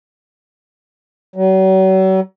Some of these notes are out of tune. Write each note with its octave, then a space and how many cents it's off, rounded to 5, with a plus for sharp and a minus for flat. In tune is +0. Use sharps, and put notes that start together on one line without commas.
F#3 +40